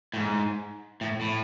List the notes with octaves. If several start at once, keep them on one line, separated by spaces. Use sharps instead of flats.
A2
G#2
A2
A2